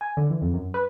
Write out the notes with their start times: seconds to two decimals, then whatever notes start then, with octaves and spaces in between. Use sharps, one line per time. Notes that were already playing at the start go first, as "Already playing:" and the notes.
0.01 G#5
0.17 D3
0.30 E3
0.41 F2
0.54 F#2
0.74 B4